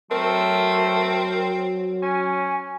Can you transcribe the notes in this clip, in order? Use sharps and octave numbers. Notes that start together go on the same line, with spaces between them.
F#3 A3 C4 A#4
C#4 G#5